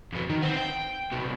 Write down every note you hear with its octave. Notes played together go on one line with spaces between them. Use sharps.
F2 B2
D#3
B3 C4
G5
C2 B2